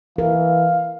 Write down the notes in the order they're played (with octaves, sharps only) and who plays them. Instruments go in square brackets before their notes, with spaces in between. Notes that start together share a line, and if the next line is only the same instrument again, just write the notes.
[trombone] E3 [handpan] A#4 [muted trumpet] F5